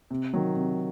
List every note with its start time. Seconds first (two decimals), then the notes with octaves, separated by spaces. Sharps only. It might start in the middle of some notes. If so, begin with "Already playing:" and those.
0.11 C3
0.33 D#3 F#3
0.56 C3